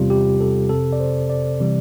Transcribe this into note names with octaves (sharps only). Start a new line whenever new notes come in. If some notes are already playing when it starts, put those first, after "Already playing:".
Already playing: E2 C3 G3 F4
G4
A4
G1 F2 C3 A4
D5
C5
D5
C3 E3 G3